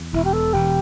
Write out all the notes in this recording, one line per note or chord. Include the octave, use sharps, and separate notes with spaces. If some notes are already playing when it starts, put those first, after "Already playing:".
Already playing: E2
E1 E4
G4
B2 A4
E1 G4